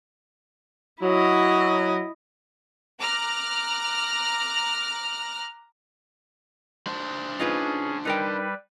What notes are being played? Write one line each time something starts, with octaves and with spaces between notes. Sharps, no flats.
F#3 E4 D#5
A#5 D6 F6 F#6 A#6
D4 C5
C#4 D#4 F4 G#4 B4
G3 D#4 A#4 B4 G5